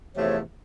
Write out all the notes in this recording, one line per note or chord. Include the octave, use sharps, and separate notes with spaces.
E2 C3 F3 A3 C#5